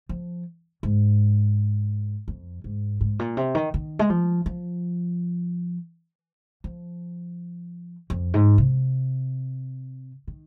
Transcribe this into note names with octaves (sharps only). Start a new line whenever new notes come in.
F3
G#2
F2
G#2
G#2
A#2
C3
D#3
D#3
G#3
F3
F3
F3
F2
G#2
C3
D#3